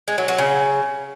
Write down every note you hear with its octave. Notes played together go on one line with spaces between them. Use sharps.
G#3
F#3
F#3
C#3